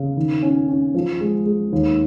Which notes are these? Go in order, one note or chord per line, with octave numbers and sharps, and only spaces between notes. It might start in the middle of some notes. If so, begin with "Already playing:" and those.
Already playing: C#3
D#3
C#4
C#4
F3
G#3
G#3
D#2